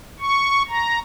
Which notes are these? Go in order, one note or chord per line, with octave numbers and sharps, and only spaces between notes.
C#6
A#5